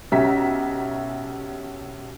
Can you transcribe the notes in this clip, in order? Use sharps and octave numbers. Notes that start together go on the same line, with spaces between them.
B1 C#4 G4 E5 A#5 B6